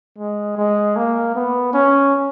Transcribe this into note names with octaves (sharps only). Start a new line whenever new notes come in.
G#3
G#3
A#3
B3
C#4